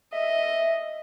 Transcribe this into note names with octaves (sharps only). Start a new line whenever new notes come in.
D#5 E5